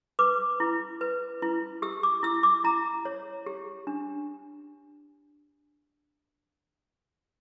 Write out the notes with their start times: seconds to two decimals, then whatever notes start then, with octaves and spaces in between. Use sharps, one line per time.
0.19 B4 D6
0.60 E4
1.01 B4
1.42 E4
1.82 G4 E6
2.03 D6
2.23 E4 E6
2.43 D6
2.64 E4 A#5
3.05 C#5
3.46 G4
3.87 D4